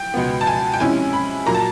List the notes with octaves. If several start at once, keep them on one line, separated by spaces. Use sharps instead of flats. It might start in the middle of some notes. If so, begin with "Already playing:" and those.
Already playing: G5
C#2 B2 G#3 B3
A5
G#5
G5
C3 F3 G#3 C#4 E4 G#5
B5
A#2 F#3 A#3 A#5
A5